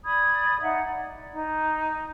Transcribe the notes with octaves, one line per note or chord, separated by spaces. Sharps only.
D5 B5 D#6 G#6
D#4 E5 F#5
D5
D#4